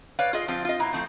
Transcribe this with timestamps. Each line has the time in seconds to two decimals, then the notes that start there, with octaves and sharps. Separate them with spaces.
0.19 B4 C#5 D5 F5
0.33 F4 G#4 D#5
0.48 F3 C4 F4
0.65 F4 D#5
0.80 B2 E4 A#5
0.93 F3 A3 C4